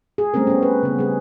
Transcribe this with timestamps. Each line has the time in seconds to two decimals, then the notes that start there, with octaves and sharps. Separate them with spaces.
0.18 G#4
0.34 G3 A3 C4 C#4 A#4
0.47 B3 C#4
0.63 B4
0.83 C#3 B3
0.99 G3 G#4